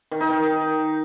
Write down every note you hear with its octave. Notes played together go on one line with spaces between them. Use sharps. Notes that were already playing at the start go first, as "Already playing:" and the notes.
D#3
D#4
D#3